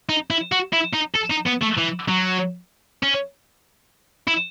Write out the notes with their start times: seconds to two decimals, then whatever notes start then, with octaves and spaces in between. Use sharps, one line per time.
0.09 D#4
0.30 E4
0.52 F#4
0.73 E4
0.93 D#4
1.14 A4
1.30 D#4
1.46 B3
1.61 A3
1.77 E3
2.08 F#3
3.03 C#4
4.28 E4